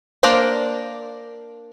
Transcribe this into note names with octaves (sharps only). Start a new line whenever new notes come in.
A#3 D4 A#4 C5 D5